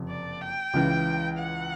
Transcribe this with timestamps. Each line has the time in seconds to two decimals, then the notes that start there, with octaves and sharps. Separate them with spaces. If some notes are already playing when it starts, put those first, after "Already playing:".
Already playing: F#1 F2 C3
0.09 D5
0.41 G5
0.74 C#2 C#3 E3
1.38 F#5